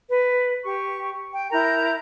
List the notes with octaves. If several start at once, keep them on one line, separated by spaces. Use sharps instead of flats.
B4
G4 C#6
G5
E4 A#4 A#5 G6